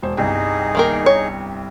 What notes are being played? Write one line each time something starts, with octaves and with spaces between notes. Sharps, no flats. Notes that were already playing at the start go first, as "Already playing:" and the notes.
E1 C5
G1 C2 D#4 G#4 G5
D#3 A#3 A#4
C#5